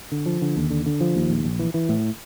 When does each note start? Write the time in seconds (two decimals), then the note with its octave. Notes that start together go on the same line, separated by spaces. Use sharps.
0.12 D3
0.26 F3
0.42 D3
0.57 D#2
0.70 D3
0.86 D3
1.01 F3
1.16 D#2
1.30 A#1
1.44 A#1
1.59 E3
1.74 E3
1.89 A2